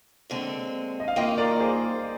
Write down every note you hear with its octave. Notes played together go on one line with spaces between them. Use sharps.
D#2 D3 G#3 C4
D#5
F5
D#3 A#3 F4 D#5 G5
A#4 D5
G#4 C5